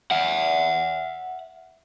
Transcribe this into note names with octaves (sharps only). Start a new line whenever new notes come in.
E5 F#5